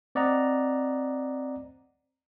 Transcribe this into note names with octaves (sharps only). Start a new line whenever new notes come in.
C4 D5 D#5 F#5 A#5